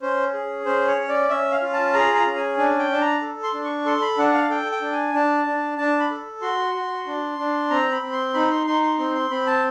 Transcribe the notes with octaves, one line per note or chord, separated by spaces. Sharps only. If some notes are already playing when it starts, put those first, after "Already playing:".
C#4 C5
G#4
C#4 C5
C#5
C#4
D5
C#4 E5
F5
F4
A5
G#4 A#5
A#5
C#4
G#5
D4 G#5
G5
D4 A5
A#5
A4
C6
D4
C#6
A4 C6
B5
D4 F#5
F5
A4 G5
G5
D4
G#5
D4 A5
D4
D4 A5
B5
A4
F#4 C6
F#4
D4
D4
C4 A#5
B5
C4
C6
D#4 B5
C6
D#4 C6
C6
C4 C6
C6
C4 B5
A5